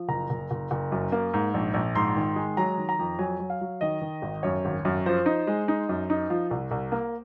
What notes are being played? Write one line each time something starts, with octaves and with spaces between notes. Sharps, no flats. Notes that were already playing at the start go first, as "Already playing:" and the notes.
Already playing: F3
F#1 A#5
F#1
F#1
F#1
F#2
A#3
G#2
A#1
A#1
G#2 C6
D#3
G#3
F#3 A#5
D#3
A#5
F2
F#3 G#5
F#3
F5
F#3
D#3 D#5
D#3
G#1
F#2 C#5
G#1
F#2
F3 C5
D#4
G#3
D#4
F#2
D#4
F3
C2
C2
A#3